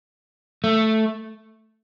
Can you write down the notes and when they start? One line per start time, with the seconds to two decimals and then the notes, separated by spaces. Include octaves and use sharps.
0.64 A3